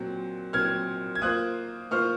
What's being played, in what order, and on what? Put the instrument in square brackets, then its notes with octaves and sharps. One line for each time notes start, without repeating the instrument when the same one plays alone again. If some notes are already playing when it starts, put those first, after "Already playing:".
Already playing: [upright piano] A#2 F#3 C4
[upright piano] A#2 F#3 C4 [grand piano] F6 G#6
[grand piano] G#6
[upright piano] A#3 F4 C5 [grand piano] D#6 F#6
[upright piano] A#3 F4 C5 [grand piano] C#6 F6